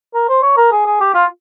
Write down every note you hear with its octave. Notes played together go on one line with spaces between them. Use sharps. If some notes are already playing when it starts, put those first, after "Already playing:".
A#4
C5
C#5
A#4
G#4
G#4
G4
F4